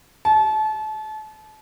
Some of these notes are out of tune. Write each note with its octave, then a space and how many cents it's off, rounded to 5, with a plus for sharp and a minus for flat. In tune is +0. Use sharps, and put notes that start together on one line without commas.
A5 -30